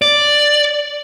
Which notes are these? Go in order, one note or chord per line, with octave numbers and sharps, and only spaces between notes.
D5